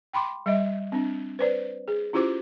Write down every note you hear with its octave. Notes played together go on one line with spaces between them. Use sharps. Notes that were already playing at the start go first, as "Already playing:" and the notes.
G5 B5 C6 D6
G3 D#5 E5
C4 D4
B4 C5 D5
G#4
C#4 E4 F4 G4 C5 D6